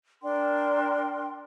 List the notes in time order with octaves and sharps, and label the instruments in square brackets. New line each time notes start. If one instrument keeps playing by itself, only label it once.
[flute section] D4 A#4 G5 C6